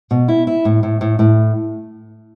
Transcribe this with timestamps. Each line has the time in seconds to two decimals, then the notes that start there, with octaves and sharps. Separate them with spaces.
0.11 B2
0.28 E4
0.47 E4
0.65 A2
0.83 A2
1.01 A2
1.19 A2